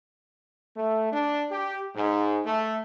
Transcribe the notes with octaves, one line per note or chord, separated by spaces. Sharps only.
A3
D4
G4
G#2
A3